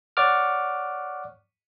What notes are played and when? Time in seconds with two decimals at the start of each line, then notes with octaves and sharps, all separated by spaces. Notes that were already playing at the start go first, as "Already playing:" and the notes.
0.17 C#5 D5 F#5 C#6 D6 F6